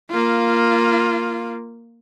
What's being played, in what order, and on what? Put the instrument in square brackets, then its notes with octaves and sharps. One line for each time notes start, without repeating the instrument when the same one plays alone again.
[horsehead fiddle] A#3 F4